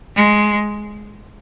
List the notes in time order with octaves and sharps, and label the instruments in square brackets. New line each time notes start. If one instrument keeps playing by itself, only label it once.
[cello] G#3